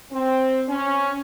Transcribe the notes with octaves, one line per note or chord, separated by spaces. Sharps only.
C4
C#4